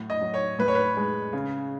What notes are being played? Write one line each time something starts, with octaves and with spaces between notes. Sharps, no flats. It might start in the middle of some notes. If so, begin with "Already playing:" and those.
Already playing: A2 F#3
D#5
F#3
C#5
A2 B4
C#5
B4
G#3
C#3